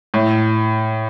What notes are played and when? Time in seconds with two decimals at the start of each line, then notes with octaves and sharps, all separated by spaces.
0.14 A2